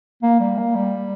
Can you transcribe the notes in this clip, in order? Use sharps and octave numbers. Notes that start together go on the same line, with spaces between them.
A#3
G3
A#3
G3